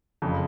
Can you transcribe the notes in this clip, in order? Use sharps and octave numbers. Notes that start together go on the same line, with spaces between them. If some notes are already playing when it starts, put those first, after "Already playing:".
F#1 F2 C#3